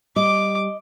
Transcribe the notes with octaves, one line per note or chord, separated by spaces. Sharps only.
G3 D#5 D6